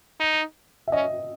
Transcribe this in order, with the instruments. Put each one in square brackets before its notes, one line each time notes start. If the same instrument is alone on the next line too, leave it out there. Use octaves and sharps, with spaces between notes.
[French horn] D#4
[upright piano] E5
[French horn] C#4 [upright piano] D#5